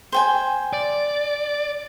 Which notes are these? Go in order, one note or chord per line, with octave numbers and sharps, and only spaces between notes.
C5 G5 G#5
D5